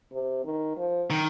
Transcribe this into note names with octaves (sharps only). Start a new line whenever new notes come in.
C3
D#3
F3
D#3